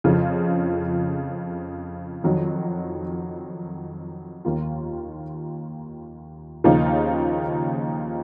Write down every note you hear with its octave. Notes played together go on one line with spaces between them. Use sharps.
F2 C#3 F3
F2 D#3 F#3
D#2 D#3 A#3 F4
D#2 C#3 F3 A#3 D#4